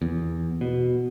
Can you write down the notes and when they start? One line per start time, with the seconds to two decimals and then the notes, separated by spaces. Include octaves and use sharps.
0.02 E2
0.61 B2